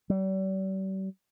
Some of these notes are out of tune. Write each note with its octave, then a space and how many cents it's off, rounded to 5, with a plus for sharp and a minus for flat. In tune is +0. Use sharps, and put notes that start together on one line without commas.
G3 -40